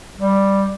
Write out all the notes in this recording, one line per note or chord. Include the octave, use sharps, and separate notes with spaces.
G3